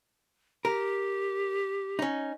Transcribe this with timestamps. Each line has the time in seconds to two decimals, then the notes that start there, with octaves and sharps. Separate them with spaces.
0.65 G4 A#4
1.99 C#4 D#4